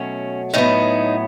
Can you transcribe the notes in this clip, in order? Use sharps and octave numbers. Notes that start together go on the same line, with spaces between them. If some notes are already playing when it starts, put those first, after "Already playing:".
Already playing: B2 F#3 A3 C#4
A2 F#3 B3 D#4